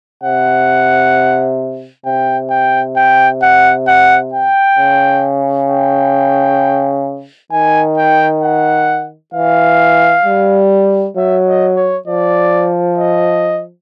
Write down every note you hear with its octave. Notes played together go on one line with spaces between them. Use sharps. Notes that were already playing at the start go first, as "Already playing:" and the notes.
C3 F#5
C3 G5
G5
G5
F#5
F#5
G5
C#3
G5
D#3 G#5
G5
F#5
E3 F5
G3
F#3 E5
D#5
C#5
F3 D5
D#5